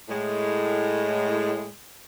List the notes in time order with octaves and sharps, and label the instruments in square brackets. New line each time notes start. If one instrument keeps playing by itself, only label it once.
[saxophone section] A2 G#3